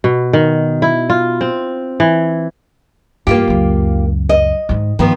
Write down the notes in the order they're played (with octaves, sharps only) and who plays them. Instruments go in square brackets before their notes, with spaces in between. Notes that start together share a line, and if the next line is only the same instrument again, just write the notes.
[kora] B2
D#3
E4
F4
C4
E3
[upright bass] E2 G2 [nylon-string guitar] A#3 F4 G4
[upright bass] C#2 F#2
[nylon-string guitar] D#5
[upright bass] G#2 D#3
[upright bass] G2 [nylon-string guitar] D#3 F3 B3